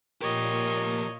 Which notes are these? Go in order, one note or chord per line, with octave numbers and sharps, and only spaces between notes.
A#2 F3 G4 A#4 C#5 D#5